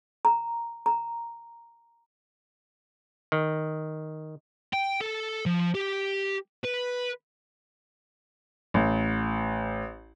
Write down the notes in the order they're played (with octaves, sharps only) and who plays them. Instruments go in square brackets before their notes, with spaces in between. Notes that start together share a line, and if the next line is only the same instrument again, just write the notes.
[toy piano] A#5
A#5
[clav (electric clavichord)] D#3
[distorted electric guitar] G5
A4
F3
G4
B4
[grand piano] A1